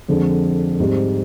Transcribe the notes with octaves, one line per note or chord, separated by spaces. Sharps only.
F2 D3 G#3 D4 G#4
G#2 G3 C4 G4